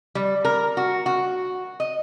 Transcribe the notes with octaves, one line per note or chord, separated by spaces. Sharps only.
G3
A#4
F#4
F#4
D#5